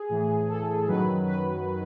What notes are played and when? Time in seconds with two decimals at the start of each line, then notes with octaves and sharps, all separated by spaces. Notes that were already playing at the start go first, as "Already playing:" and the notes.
Already playing: G#4
0.09 A2 E3
0.48 A4
0.87 F#2 D#3 F#3 B4
1.26 B4